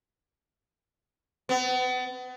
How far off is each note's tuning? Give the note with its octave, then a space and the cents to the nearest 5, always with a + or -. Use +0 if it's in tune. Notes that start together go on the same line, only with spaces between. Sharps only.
B3 +35